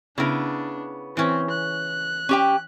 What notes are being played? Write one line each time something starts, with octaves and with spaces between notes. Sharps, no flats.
C#3 B3 D4 E4 A#4
E3 C4 C#4
F#6
C#4 G4 G5